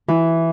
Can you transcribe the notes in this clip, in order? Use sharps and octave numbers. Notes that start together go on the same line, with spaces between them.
E3